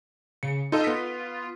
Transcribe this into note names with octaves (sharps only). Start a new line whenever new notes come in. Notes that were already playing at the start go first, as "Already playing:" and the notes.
C#3 C#7
D#4 F4 A4 D#5
B3 B6